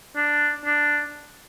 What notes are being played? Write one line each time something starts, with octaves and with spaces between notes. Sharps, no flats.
D4
D4